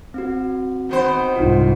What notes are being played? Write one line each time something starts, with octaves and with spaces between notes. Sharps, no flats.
C4 F#4
D#3 B3 C5
C2 G#2 D#4 F4